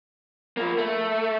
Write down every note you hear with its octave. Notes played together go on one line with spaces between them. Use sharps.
F3 A#3
A3